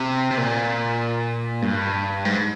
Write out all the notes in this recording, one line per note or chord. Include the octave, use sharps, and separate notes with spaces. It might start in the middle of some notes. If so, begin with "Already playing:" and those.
Already playing: C3
C3
A#2
G2
G#2